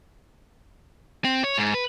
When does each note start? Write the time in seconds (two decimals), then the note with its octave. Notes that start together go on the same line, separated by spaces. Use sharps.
1.25 C4
1.44 C#5
1.58 G#2
1.74 B4